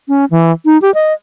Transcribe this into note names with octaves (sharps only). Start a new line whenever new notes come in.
C#4
E3
D#4
G4
D#5